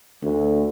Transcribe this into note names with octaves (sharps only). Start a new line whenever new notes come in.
D2